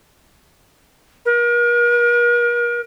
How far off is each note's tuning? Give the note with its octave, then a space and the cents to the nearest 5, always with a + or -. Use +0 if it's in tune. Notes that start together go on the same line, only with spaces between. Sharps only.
A#4 +40